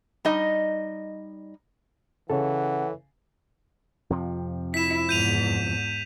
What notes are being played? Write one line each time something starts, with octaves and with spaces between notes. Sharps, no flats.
G3 D#4 D#5
C#3 E3 A4 C#5 F#5
F2 C3 F3
E4 B6 E7
E2 G#2 G6 D#7 F7